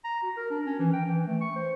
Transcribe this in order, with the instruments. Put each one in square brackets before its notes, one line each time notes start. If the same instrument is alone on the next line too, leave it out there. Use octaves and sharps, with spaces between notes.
[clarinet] A#5
F#4
A#4
D4
C#4
E3
G5
E3
A3
C#6
C5